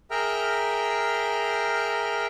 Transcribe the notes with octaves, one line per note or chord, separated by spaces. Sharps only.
G#4 A#4 E5 G5 A#5 F6